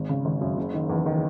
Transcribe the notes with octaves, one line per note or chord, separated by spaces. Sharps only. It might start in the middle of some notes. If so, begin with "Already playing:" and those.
Already playing: G#1
C#3
G#1
F#2
F#1
D#3
E2
D#3